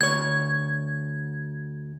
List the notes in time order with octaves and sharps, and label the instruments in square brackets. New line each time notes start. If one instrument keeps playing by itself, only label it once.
[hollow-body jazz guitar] D2 C#5 [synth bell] G#6